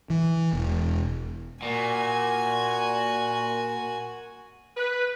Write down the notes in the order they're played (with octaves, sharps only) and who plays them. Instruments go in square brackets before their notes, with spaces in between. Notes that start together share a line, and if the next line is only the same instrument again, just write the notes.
[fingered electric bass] E3
E1
[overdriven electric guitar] A#2 [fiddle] F#4 G#5
[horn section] B4